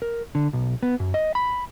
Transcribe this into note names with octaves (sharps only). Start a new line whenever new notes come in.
A#4
D3
B1
B3
F#2
D#5
B5